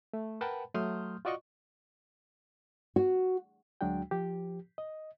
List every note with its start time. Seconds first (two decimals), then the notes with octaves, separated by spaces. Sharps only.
0.13 A3
0.41 A#4 B4 F#5 G5 A5 B5
0.75 F#3 A3 C6 D#6 F6 G6
1.25 F4 F#4 D5 D#5 C#6
2.96 F#4
3.81 D2 F#3 G#3 D4 F#4 G5
4.11 F3 G4
4.78 D#5